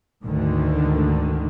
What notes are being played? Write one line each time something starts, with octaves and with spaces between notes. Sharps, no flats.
D2 G#2 D3 D#3